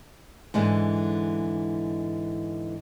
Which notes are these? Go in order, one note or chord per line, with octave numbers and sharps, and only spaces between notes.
G#2 D3 E3 G#3